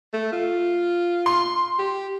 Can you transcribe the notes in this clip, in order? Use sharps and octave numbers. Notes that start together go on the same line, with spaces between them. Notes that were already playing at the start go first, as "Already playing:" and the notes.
A3
F4
C6
G4